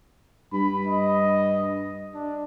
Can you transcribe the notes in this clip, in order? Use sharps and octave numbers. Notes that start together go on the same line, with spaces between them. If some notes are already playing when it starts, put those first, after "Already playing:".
G2 B5
D#5
D4